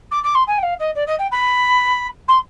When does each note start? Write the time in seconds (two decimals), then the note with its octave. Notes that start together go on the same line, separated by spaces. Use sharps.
0.11 D6
0.23 D6
0.34 C6
0.47 G#5
0.58 G5
0.62 F5
0.79 D#5
0.95 D5
1.06 D#5
1.19 G5
1.31 B5
2.28 C6